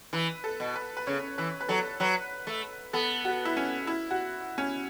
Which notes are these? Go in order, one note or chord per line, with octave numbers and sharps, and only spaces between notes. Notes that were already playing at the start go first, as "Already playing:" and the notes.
E3 B4
A4
B2
B4
B4
C#3 C#5
E3 B4
B4
F#3 A4
F#3 B4
A3
B3 A4
F#4
E4
C#4
E4
F#4
C#4